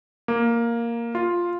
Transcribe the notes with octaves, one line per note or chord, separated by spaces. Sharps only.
A#3
F4